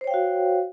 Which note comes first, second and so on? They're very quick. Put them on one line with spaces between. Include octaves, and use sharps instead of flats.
C5 C#5 G5 F5 F#4